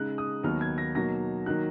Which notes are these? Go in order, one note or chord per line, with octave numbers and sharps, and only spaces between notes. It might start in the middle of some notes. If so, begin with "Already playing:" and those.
Already playing: C#3 G#3 D#4 F#6
D#6
D#2 D#3 F#3 B3 D#4 F6
G#6
A#6
B2 F#3 A#3 D#4 A#6
D#3 F#3 A#3 D#4 F#6